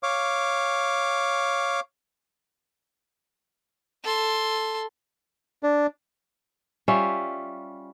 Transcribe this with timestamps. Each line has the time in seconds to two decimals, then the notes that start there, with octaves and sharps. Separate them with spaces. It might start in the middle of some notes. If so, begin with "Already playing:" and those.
0.03 C#5 F5 D6
4.04 A4 C6
5.63 D4
6.88 G3 C#4 F4 E5